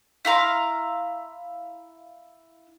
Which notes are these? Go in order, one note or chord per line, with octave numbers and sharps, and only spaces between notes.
E4 F5 A#5 C6